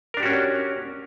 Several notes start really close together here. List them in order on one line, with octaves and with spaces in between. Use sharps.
A#4 D4 G4 F#4 C#4